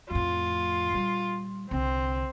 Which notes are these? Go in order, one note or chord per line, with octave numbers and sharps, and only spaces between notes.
F2 A2 F4
A#2 G3
C2 D3 C4